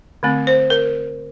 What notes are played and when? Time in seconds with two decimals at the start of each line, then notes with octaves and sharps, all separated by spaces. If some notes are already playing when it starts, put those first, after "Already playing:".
0.23 D3 A3 C4
0.47 C5
0.70 A#4